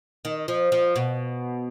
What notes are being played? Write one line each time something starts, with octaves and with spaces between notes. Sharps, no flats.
D#3
F3
F3
B2